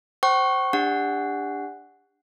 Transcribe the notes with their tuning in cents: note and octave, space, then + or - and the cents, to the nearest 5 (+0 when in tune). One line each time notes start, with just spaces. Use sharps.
C5 +0 G5 -45 C#6 -10
D4 +0 G4 +35 F#5 +0